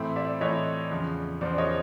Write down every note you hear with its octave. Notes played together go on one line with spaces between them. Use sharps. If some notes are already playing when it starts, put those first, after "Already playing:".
Already playing: A2 E3 A3 C4 E4
D5 E5
A2 E3 A3 C4 E4 C#5 D#5
E2 C#3 F3
E2 C#3 F3 C5 D5
C#5 D#5